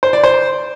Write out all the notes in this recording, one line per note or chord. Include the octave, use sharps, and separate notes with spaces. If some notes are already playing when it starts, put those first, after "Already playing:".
C5
D5
C5